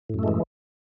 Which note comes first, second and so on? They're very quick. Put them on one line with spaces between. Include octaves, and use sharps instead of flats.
A2 F#2 A3 G#3 E3